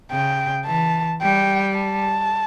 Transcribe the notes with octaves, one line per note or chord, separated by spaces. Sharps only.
C#3 G5
E3 A5
G3 G5
A5